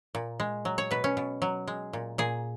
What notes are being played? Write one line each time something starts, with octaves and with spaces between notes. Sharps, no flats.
A#2
G#3
F#3
C#5
B2 B4
C#4
B2
F#3
G#3
A#2
A#2 G#4